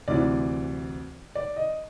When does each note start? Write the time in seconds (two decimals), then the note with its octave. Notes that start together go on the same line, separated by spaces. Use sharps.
0.08 D2 C3 E3 D5
1.35 D5
1.56 D#5